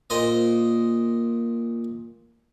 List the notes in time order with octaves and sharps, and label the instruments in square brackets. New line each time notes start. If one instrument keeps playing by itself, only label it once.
[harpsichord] A#2 C5 D#5